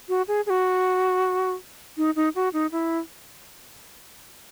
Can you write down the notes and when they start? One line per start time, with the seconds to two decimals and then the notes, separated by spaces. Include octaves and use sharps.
0.09 F#4
0.28 G#4
0.46 G#4
0.50 F#4
1.97 D#4
2.16 D#4
2.35 F#4
2.53 D#4
2.72 E4